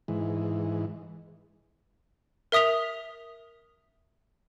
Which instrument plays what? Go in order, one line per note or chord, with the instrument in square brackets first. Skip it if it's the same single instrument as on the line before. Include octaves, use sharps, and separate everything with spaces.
[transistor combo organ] G#2 E3
[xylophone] A#4 E5 D#6 B6 F7